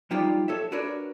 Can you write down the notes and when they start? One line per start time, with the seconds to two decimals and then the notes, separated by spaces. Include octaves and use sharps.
0.11 F3 G3 D#4 F4 G4 D5
0.48 A4 C#5 E5
0.72 D4 F#4 A#4 B4 C#5 D5